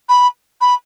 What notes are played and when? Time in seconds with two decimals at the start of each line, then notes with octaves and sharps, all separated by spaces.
0.08 B5
0.60 B5